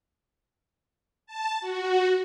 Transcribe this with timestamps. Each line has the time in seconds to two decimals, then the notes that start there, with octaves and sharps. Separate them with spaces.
1.26 A5
1.60 F#4